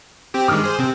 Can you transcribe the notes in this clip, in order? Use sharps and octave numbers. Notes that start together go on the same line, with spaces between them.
C4 G4
G2 D#3 G#3 D6 D#6 F6
G#4 C5
C3 C4